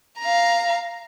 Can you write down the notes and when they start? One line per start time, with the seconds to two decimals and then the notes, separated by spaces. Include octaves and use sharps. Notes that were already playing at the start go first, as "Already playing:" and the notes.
0.19 F5 A#5